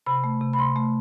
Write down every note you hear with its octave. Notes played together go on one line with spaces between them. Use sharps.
C3 B5
A3
C3
B5
C3 C6
A3